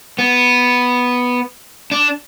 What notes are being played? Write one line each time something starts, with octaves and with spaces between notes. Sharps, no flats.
B3
D4